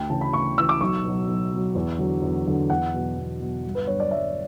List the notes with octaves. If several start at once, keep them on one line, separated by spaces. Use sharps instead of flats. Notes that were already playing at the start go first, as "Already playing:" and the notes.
Already playing: D2 G5
C#3 E3 A5
B5
D2 C#6
C#3 E3 E6
D6
B1 C#6
B2 F#3
B1
B2 F#3
E2
D3 F#3
E2
D3 F#3
E2 F#5
B2 F#3
E2
B2 F#3
G1
B4
G2 F#3 C#5
D5
G1 E5